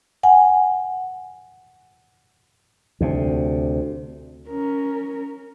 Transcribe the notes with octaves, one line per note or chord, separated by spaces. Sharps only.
F#5 G#5
D2 C3
C#4 A#4